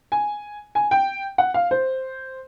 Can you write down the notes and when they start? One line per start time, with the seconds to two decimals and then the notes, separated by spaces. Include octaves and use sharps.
0.12 G#5
0.75 G#5
0.91 G5
1.38 F#5
1.54 F5
1.71 C5